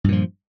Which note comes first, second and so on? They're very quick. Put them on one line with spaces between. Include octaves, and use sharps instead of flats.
G2 A#2 F3